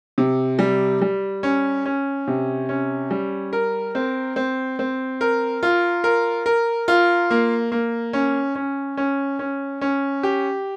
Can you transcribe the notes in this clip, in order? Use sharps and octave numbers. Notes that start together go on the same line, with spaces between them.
C3
G3
G3
C#4
C#4
C3
C#4
G3
A#4
C4
C4
C4
A#4
F4
A#4
A#4
F4
A#3
A#3
C#4
C#4
C#4
C#4
C#4
G4